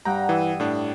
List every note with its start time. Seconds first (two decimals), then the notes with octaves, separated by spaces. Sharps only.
0.05 G2 F#5 G5 A#5
0.29 E3 D#6 E6
0.60 A2 D4